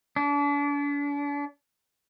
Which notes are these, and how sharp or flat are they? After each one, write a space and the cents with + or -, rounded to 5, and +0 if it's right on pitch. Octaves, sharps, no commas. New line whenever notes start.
D4 -40